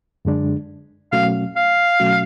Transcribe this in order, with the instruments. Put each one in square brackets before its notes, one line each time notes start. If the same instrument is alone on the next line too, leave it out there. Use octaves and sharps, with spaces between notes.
[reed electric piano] F#2 D3 G#3 D4
[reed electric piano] B2 F#3 A3 C#4 F#4 [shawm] F5
[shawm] F5
[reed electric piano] B2 F#3 A3 C#4 F#4